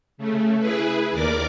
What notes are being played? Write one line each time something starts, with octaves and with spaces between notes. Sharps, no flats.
C#3 A3
E4 G#4 B4
D#2 A#4 D5 D6